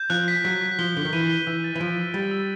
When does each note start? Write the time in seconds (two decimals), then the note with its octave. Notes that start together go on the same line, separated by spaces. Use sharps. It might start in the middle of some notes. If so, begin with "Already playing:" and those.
Already playing: G6
0.10 F3 F#6
0.28 B6
0.44 F#3 B6
0.62 B6
0.79 F3 G7
0.96 D3 G7
1.05 D#3
1.13 E3 D#7
1.30 G7
1.47 E3 E6
1.64 A6
1.75 E3
1.80 F3 D7
1.98 E6
2.14 G3 A6
2.31 E6